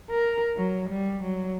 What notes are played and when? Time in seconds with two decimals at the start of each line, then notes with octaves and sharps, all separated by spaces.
0.11 A#4
0.57 F#3
0.90 G3
1.24 F#3